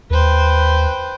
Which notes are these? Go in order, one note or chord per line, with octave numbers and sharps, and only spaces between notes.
D#2 B4 C5 G5